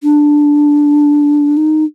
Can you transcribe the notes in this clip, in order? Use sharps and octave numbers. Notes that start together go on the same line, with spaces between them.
D4
D#4